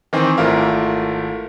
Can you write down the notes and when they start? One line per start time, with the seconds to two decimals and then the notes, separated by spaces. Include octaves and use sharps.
0.13 D#3 E3 C4 D#4
0.37 G#1 A3 E4 F4 A#4